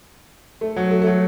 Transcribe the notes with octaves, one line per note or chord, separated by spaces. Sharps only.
A3
F#3
A3
A3
F#3